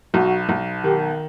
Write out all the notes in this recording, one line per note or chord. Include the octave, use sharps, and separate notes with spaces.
B1 F#4
B1
D#3 G4